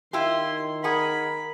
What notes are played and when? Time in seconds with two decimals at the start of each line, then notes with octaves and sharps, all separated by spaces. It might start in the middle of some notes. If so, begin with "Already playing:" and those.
0.13 D#3 E4 F4 G4 C6
0.84 G#4 A#4 F#5 B5